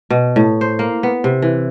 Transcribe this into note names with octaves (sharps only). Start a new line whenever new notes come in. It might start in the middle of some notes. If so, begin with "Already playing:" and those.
B2
A2
C5
A#3
B3
C3
E3